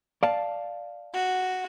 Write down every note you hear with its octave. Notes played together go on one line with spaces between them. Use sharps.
D5 F5 A5
F#4